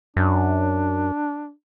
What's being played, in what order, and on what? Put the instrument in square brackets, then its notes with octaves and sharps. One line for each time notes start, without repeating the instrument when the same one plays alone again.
[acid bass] F#2 [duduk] D4